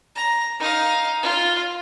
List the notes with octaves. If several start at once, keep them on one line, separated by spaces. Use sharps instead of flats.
A#5
D#4 F5
F4